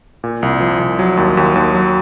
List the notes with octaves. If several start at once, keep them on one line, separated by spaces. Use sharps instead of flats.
A#2
C2
F3
C2
F#3
D#2
D#2
D#2
F#3